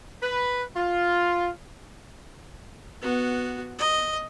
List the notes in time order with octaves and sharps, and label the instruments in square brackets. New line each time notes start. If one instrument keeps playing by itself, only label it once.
[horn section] B4
F4
[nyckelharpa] B3 F#4
D#5